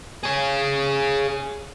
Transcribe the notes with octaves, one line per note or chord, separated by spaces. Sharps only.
G#4 C#5